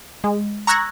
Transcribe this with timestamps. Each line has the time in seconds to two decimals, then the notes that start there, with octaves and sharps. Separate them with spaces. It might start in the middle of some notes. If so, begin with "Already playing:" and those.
0.24 G#3
0.67 A#5 C#6 E6 F#6 G#6 A#6